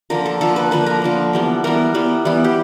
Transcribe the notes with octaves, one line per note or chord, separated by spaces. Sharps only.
D3 F3 A#3 A#4
A4
D3 F3 A#3 A4
B4
D3 F3 A#3 B4
A#4
D3 F3 A#3
E3 G3 B3
E3 G3 B3 A#4
E3 G3 B3
E3 G3 B3
G4